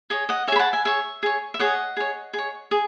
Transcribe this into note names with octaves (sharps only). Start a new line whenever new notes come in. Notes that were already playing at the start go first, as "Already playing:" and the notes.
G#4 C#5 D#5
D#5 F#5
G#4 C#5 E5 G#5 B5
F#5 A5
E5 G#5
G#4 C#5 E5
G#4 C#5
E5
G#4 C#5 D#5 F#5
G#4 C#5
G#4
C#5
G#4